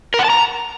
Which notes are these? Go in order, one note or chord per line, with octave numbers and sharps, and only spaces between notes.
A#4
F#5
A5
A#5